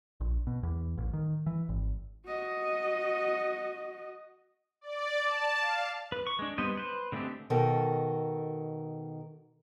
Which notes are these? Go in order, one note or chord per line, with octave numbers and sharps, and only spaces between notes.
A#1
B2
E2
A1
D#3
E3
G#1
F#4 D#5
D5
A5
F5
B4
C#6
G#3 D4
G3 B3 B4 C5 D#5
B4 C5
D3 G#3 A3 C4 G4
B2 D#3 A4 A#4